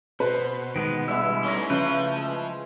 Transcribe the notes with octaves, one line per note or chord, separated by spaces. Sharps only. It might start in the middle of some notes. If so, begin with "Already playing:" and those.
B2 B4 C5 B5
D#3 G#3 B3
D3 E3 G3 G#3 E4 E6
A3 B3 C#4 D#4 A#5
C#3 F3 A3 F4 B4
G#3